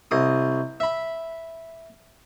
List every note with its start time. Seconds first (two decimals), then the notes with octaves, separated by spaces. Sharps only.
0.11 C2 D#5 D#6
0.80 E5 B5